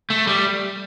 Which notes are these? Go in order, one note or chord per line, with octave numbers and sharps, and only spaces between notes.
A3
G3